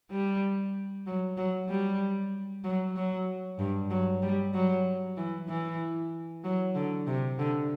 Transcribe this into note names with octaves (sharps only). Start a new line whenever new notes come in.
G3
F#3
F#3
G3
F#3
F#3
G2
F#3
G3
F#3
E3
E3
F#3
D3
C3
D3